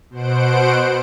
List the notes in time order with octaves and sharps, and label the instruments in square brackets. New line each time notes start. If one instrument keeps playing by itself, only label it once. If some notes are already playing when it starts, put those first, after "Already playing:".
[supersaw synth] B2 C5 F#5 D7